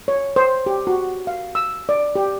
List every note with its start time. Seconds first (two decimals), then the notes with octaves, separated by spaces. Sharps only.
0.08 C#5
0.36 C5
0.66 G4
0.87 F#4
1.27 F5
1.55 E6
1.89 D5
2.16 G4